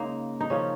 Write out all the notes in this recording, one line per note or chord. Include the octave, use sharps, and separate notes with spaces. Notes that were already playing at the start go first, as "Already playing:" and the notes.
Already playing: C#3 G#3 A#3 D#4
D#4
C#3 F3 A#3 C#4